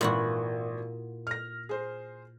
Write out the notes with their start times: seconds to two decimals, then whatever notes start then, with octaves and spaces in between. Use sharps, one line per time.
0.01 G#1 A#2 E3 E4 F#4
1.27 F6 A#6
1.69 G#4 C5